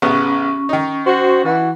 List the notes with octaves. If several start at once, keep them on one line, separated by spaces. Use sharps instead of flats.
A1 C#3 B3 C#4 C#6
D#3 D#4
F#4 C5
E3 F#4